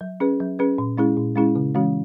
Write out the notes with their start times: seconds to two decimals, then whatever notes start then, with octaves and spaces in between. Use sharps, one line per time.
0.01 F#3
0.20 C#4 G#4 B4
0.40 F#3
0.59 C#4 G#4 B4
0.78 A#2
0.98 G#3 C#4 E4 G#4
1.18 A#2
1.36 G#3 C#4 E4 G#4
1.55 C#3
1.75 E3 G#3 C#4 F#4